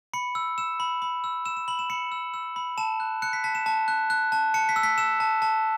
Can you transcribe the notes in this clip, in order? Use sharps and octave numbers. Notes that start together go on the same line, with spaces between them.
B5 C#7
E6
E6 E7
B5
B5
E6
E6 E7
E7
B5 F#7
E7
B5 C#7
E6
E6
B5
A5 E7
F#6
F#6 C#7
B6
A5 B6
E7
A5
F#6
F#6
A5
A5 C#7
B6
E6
B6
E6 E7
A5
A5